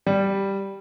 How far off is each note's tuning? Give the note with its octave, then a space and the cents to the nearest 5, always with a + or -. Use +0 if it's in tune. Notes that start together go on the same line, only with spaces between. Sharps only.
G3 +0 D5 +0